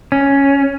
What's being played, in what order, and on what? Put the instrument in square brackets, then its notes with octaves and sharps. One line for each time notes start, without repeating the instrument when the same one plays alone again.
[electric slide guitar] C#4